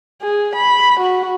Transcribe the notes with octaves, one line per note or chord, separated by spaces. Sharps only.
G#4
B5
F#4